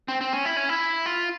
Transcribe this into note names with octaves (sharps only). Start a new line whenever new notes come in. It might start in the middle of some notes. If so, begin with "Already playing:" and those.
C4
C4
C#4
E4
C#4
E4
F4